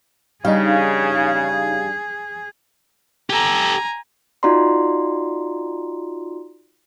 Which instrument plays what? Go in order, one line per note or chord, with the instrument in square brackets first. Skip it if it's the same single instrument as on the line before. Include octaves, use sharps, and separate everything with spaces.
[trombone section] C#3 [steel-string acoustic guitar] G3 D4 [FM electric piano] D#4 F5 [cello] G#4
[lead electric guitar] G4 A4 [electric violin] G#5 A#5
[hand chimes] D#4 F4 F#4 D5 A#5 C6